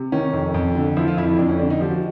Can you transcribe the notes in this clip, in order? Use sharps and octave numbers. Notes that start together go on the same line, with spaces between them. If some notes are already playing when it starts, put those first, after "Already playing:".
Already playing: C3
D#3 C#4
F2
F2
D3
F3 E4
F4
F2 E4
E4
F2 D4
C#4
D3 D4
D#4
F3 G4
F#4